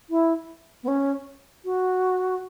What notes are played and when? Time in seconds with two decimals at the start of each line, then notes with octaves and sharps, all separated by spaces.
0.09 E4
0.83 B3
0.88 C#4
1.65 F#4